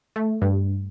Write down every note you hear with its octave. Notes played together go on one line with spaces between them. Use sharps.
A3
G2